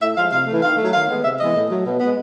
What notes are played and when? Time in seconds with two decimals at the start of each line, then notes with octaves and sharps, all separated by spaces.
0.01 A2 E5
0.17 F3 G#3 F5
0.32 C3 F5
0.47 E3 A3
0.63 D#3 F5
0.77 F#3 A3
0.93 D#3 F5
1.08 G#3 B3
1.23 C3 E5
1.39 E3 G#3 B3 D#5
1.55 A2
1.70 F#3 A3
1.86 B2
2.00 G#3 B3